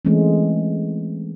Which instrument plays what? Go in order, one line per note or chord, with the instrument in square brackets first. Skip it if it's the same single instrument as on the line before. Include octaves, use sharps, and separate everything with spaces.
[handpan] E3 G#3 A3 C4 C#4